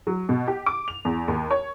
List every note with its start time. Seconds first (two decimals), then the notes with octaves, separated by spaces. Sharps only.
0.07 F#3
0.29 B2
0.47 G4
0.66 D6
0.88 F7
1.05 E2
1.28 D#2
1.51 C#5